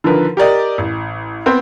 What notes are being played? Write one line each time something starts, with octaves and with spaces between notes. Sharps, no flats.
D3 D#3 F3 A#4 B4
G4 A#4 D5 D#5
A1
B3 C4 C5